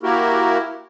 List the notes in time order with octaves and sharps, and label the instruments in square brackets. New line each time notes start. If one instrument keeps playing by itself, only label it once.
[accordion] A#3 E4 F#4 G4 A#4